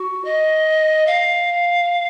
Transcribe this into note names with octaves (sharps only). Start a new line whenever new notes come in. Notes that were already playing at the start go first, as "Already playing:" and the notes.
Already playing: F#4
D#5
F5